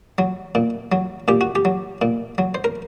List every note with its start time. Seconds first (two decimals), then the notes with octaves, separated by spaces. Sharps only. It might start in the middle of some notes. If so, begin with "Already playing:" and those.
0.18 F#3
0.55 A#2
0.92 F#3
1.28 A#2 G4
1.41 F#4
1.55 G4
1.65 F#3
2.02 A#2
2.38 F#3
2.55 C5
2.64 A#4